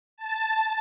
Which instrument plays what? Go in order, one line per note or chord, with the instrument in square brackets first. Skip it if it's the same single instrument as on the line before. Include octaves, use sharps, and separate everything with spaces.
[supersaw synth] A5